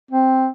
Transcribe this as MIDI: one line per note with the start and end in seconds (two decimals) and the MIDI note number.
0.11 0.47 60